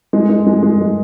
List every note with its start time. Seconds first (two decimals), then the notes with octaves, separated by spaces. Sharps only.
0.13 G#3
0.30 G#3
0.47 G#3
0.63 G#3
0.81 G#3